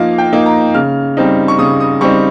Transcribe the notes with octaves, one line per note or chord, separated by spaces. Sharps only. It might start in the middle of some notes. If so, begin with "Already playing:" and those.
Already playing: F3 A#3 D#4 D#5 F5
G5
A#3 D#4
A#5
C#3 F6
G3 C4 D#4
C#6
C#3 D#6
D#6
G3 C4 D#4 C#6